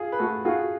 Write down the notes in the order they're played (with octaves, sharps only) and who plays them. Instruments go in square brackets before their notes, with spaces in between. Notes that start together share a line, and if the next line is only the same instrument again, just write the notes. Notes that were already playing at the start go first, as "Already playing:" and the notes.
Already playing: [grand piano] F4 G#4
B4
[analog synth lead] A3 [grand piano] F#4 A4
[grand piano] F4 G#4 [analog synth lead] F#4